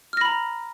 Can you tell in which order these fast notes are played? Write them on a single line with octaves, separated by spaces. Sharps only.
F6 A#6 B5 A#5